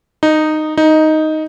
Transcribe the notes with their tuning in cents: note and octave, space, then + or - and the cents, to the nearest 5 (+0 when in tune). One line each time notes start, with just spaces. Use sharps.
D#4 -10
D#4 +5